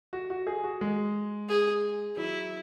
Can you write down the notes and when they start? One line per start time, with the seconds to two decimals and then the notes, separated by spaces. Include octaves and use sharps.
0.13 F#4
0.30 F#4
0.47 G#4
0.64 F#4
0.81 G#3
1.49 G#4
2.16 F#3 E4